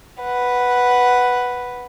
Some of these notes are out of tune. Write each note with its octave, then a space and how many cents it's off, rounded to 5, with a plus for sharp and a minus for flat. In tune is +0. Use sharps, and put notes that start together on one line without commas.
B4 +0 F#5 +0